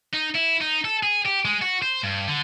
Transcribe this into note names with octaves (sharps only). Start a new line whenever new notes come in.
D#4
E4
D#4
A4
G#4
G4
G#3
F#4
C5
G2
D3